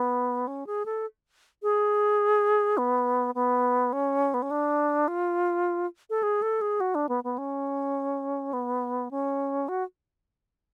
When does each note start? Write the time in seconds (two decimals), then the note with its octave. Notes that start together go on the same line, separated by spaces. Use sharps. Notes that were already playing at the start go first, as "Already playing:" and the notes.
Already playing: B3
0.47 C#4
0.66 G#4
0.85 A4
1.63 G#4
2.78 B3
3.35 B3
3.93 C#4
4.34 B3
4.42 C#4
4.51 D4
5.08 F4
6.10 A4
6.23 G#4
6.42 A4
6.61 G#4
6.80 F#4
6.95 D4
7.09 B3
7.24 B3
7.38 C#4
8.53 B3
9.11 C#4
9.68 F#4